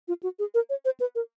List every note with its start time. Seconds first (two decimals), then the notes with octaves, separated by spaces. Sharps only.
0.08 F4
0.23 F#4
0.39 G#4
0.54 A#4
0.70 C#5
0.85 C5
1.00 B4
1.15 A#4